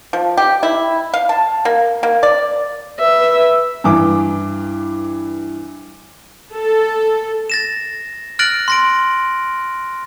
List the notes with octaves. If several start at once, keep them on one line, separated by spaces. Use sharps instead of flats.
F3
G4
E4
F5
A5
A#3
A#3
D5
B4 E5
G2 E3 D6
A4
A6 A#6 E7
F6 F#6 A6 A#6 D7 F#7
C6 A#6 D7